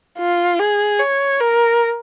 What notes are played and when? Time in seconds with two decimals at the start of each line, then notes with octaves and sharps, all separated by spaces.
0.19 F4
0.59 G#4
0.99 C#5
1.40 A#4